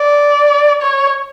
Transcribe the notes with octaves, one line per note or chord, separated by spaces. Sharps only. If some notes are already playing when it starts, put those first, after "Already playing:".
Already playing: D5
C#5